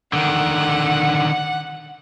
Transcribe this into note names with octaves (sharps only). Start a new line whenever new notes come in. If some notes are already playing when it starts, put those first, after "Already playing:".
D3 D#3 F#5